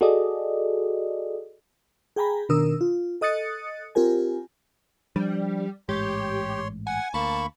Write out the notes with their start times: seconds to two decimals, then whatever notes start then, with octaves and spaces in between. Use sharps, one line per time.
0.01 F#4 G#4 A4 D5 D#5
2.16 G#4 G5 G#5 A#5 B5
2.49 B2 D#3 D4 A#4 D#6 E6
2.81 F4
3.21 A4 D#5 D#6 F#6 A6 C#7
3.95 C4 F4 G4 A#4 G#5
5.16 F3 G3 D4
5.89 A1 G#2 G#3 G4 C#5 C6
6.87 F#5 G#5
7.14 D2 A#3 A5 B5 C#6